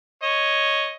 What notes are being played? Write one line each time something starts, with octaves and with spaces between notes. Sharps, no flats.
C#5 D#5